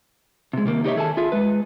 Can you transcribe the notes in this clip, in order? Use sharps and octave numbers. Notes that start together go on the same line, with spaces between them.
C3 G#3
C3 D#3 A#3
D#4 F#4 G4 C#5 D#5 E5
D#3 G#4 A4 F#5 G#5 A5
F4 G#4 E5
G#3 B4